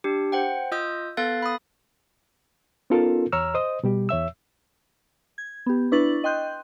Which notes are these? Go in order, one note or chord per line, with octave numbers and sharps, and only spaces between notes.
D4 G4
C5 F#5 G5
F4 D#5 D#6 E6 G6
B3 A4 F5 F#6 A6
B5 D#6
B3 C#4 D#4 F4 A4 A#4
E2 C#5 A#5 E6 F6
C5 D#5 D#6
B2 G3 G4
E2 C#5 E5 E6
G#6
B3 G4
D4 E4 B4 C#6 A6 F#7
D#5 G5 C6 F#6 G6